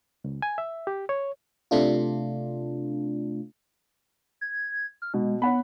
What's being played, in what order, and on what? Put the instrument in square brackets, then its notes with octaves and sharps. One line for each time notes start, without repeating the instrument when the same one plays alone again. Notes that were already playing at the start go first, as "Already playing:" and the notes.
[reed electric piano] C#2
G#5
E5
G4
C#5
[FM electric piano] C3 A3 D4 F4
[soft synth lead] G#6
F6
[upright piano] B2 [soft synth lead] G#3
[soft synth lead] B3 [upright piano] C#5 F#5 B5